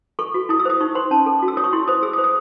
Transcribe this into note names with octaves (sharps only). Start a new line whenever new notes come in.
A4 C#6
F#4
E4 D#6
E6
C5 D#6
D#4 C#6
C5 C6
C#4 A5
A4
F#4
E6
C#5 D#6
C#6
E4 C6
C5 D#6
G#4 E6
D#6
C5
D#6